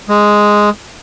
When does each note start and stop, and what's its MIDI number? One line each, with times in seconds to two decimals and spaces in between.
0.09 0.70 56